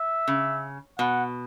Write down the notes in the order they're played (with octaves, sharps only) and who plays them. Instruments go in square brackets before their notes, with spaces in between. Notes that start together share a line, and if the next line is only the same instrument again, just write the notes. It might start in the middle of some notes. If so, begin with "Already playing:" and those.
Already playing: [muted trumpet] E5
[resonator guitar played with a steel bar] C#3
[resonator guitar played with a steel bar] B2 [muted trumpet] F#5